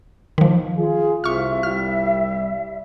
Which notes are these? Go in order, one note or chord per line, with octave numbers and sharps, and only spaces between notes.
D#3 F3
F4 G#4
C2 C3 F4 E5 C#6 F6
C2 G3 F6